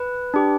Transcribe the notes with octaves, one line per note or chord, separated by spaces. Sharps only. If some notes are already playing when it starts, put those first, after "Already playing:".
Already playing: B4
D4 G4